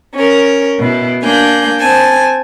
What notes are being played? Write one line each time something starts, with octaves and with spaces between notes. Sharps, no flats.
C#4 A#4
B2 E4
A#3 D4 G#5 G6
C4 G#5 A5